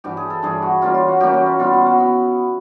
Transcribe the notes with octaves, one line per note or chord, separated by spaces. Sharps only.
G2 E3 G3 G4
G#4
A4
G2 E3 G3 G#4
F#4
E3 G3 A#3 C#4 F4
F4
F#4
E3 G3 A#3 C#4 G4
F#4
F4
B2 G3 B3 E4 F4
F4
F#4
B3 E4